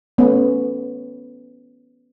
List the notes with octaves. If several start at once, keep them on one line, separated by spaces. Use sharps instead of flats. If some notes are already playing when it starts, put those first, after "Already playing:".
A3 B3 C#4